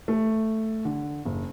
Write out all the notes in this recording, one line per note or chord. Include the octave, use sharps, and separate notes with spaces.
A3
D3
F#1